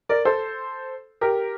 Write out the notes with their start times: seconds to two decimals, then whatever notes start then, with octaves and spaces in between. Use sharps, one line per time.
0.09 A#4 D5
0.25 A4 C5
1.21 G4 A#4